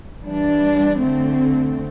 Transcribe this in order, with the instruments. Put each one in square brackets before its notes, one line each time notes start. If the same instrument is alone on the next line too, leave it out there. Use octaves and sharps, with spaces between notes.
[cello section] E3 G3 D4
D3 A3 C4